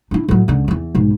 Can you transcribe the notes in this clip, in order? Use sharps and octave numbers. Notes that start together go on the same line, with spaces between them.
D4 E4
A2 F#3
C#2 D3
E2 E3
B1 G#2